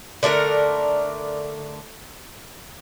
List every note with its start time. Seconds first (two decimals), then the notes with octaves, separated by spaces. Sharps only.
0.23 D3 A3 D4 A#4